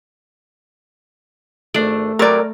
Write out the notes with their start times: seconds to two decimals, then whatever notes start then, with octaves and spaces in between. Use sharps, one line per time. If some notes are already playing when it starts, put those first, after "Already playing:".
1.74 G#1 A3 D4 D5
2.19 C3 F#3 G3 A#4 D5